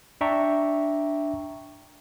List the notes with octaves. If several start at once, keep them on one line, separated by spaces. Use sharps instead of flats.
D4 E5 G5 A#5 C#6